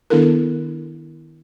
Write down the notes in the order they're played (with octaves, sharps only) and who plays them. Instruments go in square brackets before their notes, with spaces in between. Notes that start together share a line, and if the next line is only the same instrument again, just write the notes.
[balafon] D#3 B3 D4 E4 A4 A#4